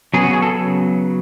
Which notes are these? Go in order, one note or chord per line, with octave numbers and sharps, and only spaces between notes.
C#3 F#3 B3 G#4
F#4
G#4
A4